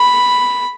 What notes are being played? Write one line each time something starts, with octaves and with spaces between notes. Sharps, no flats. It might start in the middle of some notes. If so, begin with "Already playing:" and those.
Already playing: B5